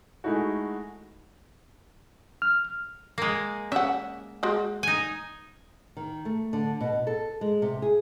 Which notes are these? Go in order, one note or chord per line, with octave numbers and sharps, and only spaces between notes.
G#3 A3 D#4 E4 F#4
F6
G#3 A#3
C#4 E5 F#5
G#3 F#4
D#4 G#5
D#3
A3
D3
B2
A4
G#3
C3
G#4